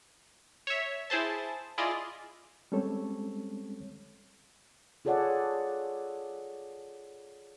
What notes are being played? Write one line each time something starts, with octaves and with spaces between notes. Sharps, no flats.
C#5 E5
E4 G#4 C5 A5
E4 F4 G#4 D5 D#5
G3 G#3 C4 C#4 A4 C#5
F4 G#4 A4 C#5 D5 F#5